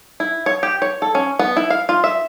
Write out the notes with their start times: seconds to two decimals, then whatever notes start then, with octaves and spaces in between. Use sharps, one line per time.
0.20 E4
0.46 C#5
0.63 G4
0.82 C#5
1.02 A4
1.15 C#4
1.39 B3
1.57 E4
1.70 F5
1.89 F4
2.04 E5